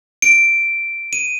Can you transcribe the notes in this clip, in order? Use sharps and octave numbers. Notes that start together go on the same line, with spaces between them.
D7
D#7